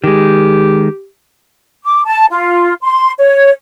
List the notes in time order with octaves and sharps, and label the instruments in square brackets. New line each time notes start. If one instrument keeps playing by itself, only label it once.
[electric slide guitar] D#3 G#3 [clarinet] G4
[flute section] D6
A5
F4
C6
C#5